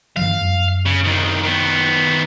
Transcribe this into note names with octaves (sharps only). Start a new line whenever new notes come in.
G2 E3 F3 F5
F#2
C#3
C2 D#3
D#3 B3